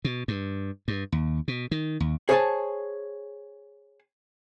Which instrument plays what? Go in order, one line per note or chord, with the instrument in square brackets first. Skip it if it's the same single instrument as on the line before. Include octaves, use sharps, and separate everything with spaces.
[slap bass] B2
G2
G2
D#2
B2
D#3
D#2
[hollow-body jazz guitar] G#4 C5 C#5 D#5 G#5 A5